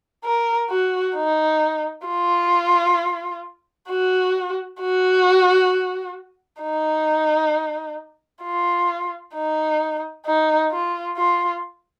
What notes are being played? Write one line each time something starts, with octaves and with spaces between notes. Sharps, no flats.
A#4
F#4
D#4
F4
F#4
F#4
D#4
F4
D#4
D#4
F4
F4